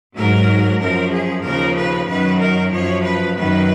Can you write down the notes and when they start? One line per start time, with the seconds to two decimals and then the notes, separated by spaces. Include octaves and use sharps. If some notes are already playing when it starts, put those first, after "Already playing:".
0.17 G#2 F#3 A#4
0.80 F#2 F3 A#4
1.13 G#4
1.44 D#2 C#3 F3 A#4
1.76 B4
2.08 F#2 D#3 F#3 B4
2.39 A#4
2.71 F#2 F3 C#5
3.03 B4
3.35 F#2 D#3 F#3 B4